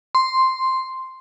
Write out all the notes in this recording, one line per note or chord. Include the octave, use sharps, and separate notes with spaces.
C6